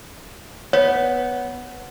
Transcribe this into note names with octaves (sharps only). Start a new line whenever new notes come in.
B3 C#5